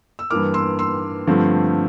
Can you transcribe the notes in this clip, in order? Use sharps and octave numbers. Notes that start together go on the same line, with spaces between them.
E6
G2 E3 A#3 D6 F6
C6 E6
C6 E6
G2 D3 F3 A3 C4